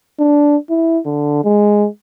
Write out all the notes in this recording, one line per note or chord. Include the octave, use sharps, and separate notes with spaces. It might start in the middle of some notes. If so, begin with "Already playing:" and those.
D4
E4
D3
G#3